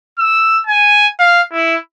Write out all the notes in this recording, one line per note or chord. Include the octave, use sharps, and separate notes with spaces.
E6
G#5
F5
E4